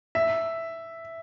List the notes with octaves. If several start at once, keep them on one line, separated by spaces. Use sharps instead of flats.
E5